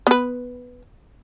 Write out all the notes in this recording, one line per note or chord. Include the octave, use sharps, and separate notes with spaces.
B3 B4